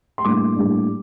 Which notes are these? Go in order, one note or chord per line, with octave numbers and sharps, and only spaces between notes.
C6
A2 G3 A#3 D4 D6
A2 G3 A#3 D4